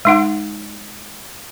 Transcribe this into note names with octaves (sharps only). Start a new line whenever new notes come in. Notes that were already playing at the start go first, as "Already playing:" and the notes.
G#3 D#4 F#5